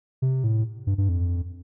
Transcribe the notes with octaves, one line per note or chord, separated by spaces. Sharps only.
C3
A2
G2
G2
F2